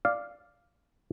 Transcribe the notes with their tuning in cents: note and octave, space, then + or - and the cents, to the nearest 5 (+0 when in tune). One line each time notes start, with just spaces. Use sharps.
D5 +0 F5 +0